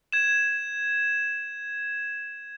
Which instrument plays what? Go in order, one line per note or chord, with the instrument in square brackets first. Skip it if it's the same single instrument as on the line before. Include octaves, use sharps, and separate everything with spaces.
[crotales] G#6 E7